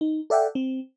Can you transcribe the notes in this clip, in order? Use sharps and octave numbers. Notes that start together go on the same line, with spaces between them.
D#4
A4 D5 E5 F#5 G5
C4